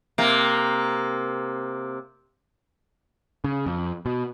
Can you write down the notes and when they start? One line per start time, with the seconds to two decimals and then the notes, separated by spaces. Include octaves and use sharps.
0.18 C3 A#3
3.44 C#3
3.66 F2
4.06 B2